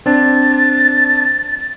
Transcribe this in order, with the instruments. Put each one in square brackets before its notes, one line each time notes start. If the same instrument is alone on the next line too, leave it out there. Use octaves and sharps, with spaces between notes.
[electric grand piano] C4 D4 [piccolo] A6